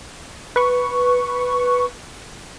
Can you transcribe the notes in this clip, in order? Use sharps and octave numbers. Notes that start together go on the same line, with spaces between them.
B4 C#6